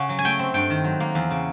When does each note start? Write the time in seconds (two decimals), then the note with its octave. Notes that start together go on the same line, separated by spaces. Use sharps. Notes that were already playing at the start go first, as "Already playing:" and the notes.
Already playing: C#3 C#4 F#5
0.09 F#3
0.19 G#5
0.25 A3 G5
0.39 C4
0.54 G2 G5
0.70 D#3
0.84 F#3
1.00 A#3
1.15 E2
1.30 C#3